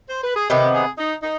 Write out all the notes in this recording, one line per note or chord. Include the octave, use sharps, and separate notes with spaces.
C5
B4
G#4
C3 D#3 B3 G4
G#4
D#4
D#4